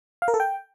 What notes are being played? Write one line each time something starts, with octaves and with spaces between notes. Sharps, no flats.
F5
A#4
A4
G5